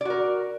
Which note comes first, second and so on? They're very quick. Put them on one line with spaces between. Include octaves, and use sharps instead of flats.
D5 F#4 A#4